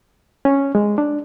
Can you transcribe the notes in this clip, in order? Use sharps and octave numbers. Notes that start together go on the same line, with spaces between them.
C#4
G#3
D4